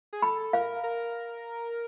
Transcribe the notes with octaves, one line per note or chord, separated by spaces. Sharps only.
G#4
A4 B5
A#4 F5
A#4